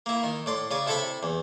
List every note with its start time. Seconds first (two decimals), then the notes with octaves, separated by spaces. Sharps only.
0.06 A#3 E4
0.24 D#3
0.46 A2 D5 C6
0.71 C#3 D5 G#5
0.87 C3 E4 A4 E5 B5
1.23 E2